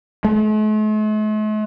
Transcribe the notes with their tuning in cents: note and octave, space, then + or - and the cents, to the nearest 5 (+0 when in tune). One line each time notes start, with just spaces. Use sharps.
A3 -45